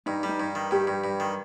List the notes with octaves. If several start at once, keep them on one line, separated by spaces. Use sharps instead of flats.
G2 D#4
G3
D#4
G2
D#3
G2 G4
G2
G2
D#3